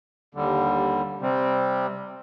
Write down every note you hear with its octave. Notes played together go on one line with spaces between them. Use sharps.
D#2 D3 G3
C3 G3 C4